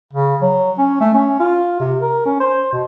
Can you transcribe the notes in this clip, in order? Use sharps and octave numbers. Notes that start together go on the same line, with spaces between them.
C#3
F#3
C#4
A3
C#4
F4
C3
A#4
C#4
C5
B2